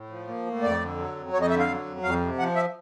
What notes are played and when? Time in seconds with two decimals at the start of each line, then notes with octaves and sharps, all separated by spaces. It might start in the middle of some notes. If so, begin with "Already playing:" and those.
Already playing: A2
0.10 F3
0.28 A#3
0.46 A2
0.63 F2 D5
0.80 D3
0.98 F#3
1.16 F2
1.33 F2 C#5
1.41 D#5
1.50 D3 E5
1.59 F5
1.68 F#3
1.86 F2
2.03 F2 F5
2.20 C3
2.38 F3 F#5
2.56 E5